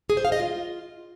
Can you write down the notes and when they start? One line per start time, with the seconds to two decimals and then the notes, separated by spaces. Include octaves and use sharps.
0.10 G#4
0.17 C5
0.25 F5
0.32 D#5
0.40 F4